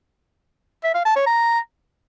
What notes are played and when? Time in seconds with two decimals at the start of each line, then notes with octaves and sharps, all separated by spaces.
0.84 E5
0.95 F5
1.05 A5
1.16 C#5
1.27 A#5